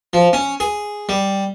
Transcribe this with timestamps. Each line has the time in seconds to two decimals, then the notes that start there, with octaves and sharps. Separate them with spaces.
0.13 F3
0.33 C#4
0.60 G#4
1.09 G3